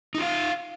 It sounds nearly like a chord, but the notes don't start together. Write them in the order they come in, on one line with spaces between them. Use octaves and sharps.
D#4 F4 F5